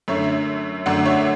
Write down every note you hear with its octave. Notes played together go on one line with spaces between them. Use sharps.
F#2 D3 A3 C#5 E5
F#2 D3 A3 D5 F#5
C#5 E5